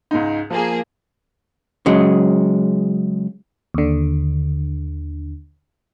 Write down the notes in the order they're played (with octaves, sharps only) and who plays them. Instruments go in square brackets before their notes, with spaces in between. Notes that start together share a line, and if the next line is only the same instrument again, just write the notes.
[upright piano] C#2 G#2 D#4
[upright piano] F3 [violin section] A#3 G#4
[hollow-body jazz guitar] C#3 F#3 G#3
[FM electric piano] D#2 D3